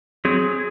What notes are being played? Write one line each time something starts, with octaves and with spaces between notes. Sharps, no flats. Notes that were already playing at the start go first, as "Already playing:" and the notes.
F#3 C4 G#4